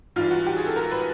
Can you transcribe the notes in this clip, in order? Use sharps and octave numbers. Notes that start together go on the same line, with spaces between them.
G#2 E3 G3 F4
F#4
G4
G#4
A4
A#4
B4